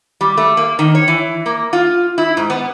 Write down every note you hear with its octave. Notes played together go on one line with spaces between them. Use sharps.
G3
A3
A#3
D#3
C#5
E3
A#3
F4
E4
G#2
B3